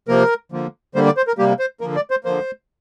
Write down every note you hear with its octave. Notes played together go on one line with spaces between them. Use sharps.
C3 F3 A#3 A#4
D3 F3 A#3
D3 G3 A#3 C5
D5
C5
A#4
C3 G3 A#3 G4
C5
D3 F3 A#3 A#4
D5
C5
D3 F3 A#3 C5